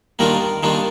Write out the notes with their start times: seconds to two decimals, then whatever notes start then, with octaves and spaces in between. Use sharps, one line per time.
0.19 D#3 G3 A#3 D4 F4 A#4
0.63 D#3 G3 A#3 D4 F4